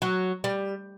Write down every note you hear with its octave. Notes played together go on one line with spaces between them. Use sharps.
F#3
G3